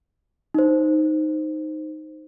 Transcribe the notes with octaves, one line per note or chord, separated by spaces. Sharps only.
D#4 C5